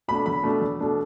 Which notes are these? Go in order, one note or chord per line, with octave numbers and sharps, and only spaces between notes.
B2 A3 D4 B5
E2 B5
B2 A3 D4
E2
B2 A3 D4